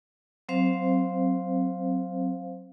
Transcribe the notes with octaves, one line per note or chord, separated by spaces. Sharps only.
F#3 C4 C5 F5